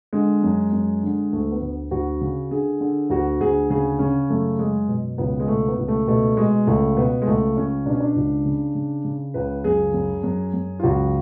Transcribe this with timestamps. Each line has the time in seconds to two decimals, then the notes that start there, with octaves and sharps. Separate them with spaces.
0.13 D3 G#3
0.43 F#2
0.72 F#2
1.03 D3
1.33 D2 A3
1.52 B3
1.61 D2
1.91 D2 F#4
2.21 C#3
2.51 D3 G#4
2.81 D3
3.10 D2 F#4
3.40 D2 G#4
3.70 C#3 G#4
3.99 C#3 C#4
4.30 F#2 A3
4.59 F#2 G#3
4.88 B2
5.18 C#2 B3
5.40 G#3
5.48 B2 A3
5.68 B3
5.79 C#2
5.88 A3
6.07 B2 A3
6.37 B2 G#3
6.67 C#2 A3
6.96 B2 B3
7.22 G#3
7.27 C#2 A3
7.57 C#2 C#4
7.86 B2 D4
7.93 C#4
8.00 D4
8.16 C#2
8.46 C#3
8.75 C#3
9.04 C#3
9.34 C#2 B4
9.64 F#2 G#4
9.94 F#2
10.23 F#2
10.54 F#2
10.79 F4
10.83 C#2 F#4